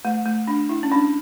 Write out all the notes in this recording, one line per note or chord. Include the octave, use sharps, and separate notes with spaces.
A3
A3
D4
E4
C#4
D4